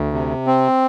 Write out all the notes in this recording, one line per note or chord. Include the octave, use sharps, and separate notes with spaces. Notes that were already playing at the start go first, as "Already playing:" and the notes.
Already playing: D2
C3
C4